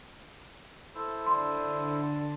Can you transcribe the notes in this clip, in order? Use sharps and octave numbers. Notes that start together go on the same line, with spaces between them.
E4 A4 C5
D3 C6
A5